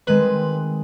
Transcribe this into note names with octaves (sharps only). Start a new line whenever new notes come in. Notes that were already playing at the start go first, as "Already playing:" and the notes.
D#3 G#3 C4 B4